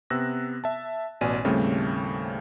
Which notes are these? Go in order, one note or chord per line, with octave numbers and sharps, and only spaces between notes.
C3 B3 E6 F#6 A#6
E5 A5
A1 B2 D5 G#5 D#7
D#2 A2 C#3 G3 A3 C4